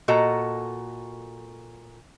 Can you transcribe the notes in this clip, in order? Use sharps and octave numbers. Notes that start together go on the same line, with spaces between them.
A#2 F#4 A4 D#5 A#5